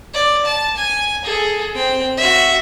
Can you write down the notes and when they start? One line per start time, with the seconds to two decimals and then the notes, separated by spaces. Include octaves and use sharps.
0.14 D5
0.45 A5
0.77 G#5
1.25 G#4 A4
1.75 C4 G5
2.18 F#4 E5